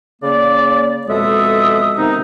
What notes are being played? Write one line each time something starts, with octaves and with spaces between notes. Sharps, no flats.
C#3 A#3 D5
F2 B2 G#3 A4 E5 D#6
C3 D#3 B3 D#4